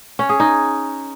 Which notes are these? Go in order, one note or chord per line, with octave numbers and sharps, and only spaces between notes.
C#4
G#4
D#4